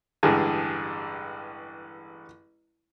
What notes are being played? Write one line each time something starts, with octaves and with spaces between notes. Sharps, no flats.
A1 G2 D3 G#3 G#4